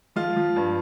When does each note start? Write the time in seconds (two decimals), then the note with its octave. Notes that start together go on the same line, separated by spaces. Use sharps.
0.16 F3 F4
0.36 F3
0.56 G2